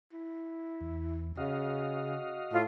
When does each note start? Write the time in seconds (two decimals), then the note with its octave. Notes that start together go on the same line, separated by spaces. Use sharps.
0.12 E4
0.81 E2
1.37 C#3 F#4 D#5 F5
2.52 A2 F4